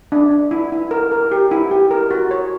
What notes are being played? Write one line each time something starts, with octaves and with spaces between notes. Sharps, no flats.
D4
D4
E4
E4
A#4
A#4
G4
E4
G4
A#4
F#4
C#5